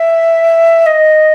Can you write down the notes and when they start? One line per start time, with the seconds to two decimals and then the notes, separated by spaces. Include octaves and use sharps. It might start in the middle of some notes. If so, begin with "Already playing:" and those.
Already playing: E5
0.86 D#5